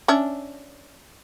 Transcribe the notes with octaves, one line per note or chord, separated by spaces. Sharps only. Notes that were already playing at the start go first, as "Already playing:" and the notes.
C#4 D4 E5